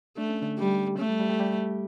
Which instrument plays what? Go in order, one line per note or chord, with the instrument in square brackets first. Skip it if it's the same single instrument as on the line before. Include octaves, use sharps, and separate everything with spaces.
[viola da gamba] A3 [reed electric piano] D4
[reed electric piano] C#4
D3 D4
[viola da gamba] G3
[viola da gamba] A3 [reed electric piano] C#4
[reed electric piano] G3 G4
G3 G4
G3 G4
G3 G4